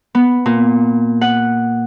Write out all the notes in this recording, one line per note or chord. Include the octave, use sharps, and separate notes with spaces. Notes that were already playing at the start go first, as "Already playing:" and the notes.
B3
A#2
F#5